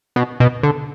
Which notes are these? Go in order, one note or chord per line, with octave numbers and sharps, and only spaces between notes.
B2
B2
D3